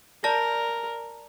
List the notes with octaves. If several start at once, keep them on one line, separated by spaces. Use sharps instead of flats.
A#4 D5 A5 A#6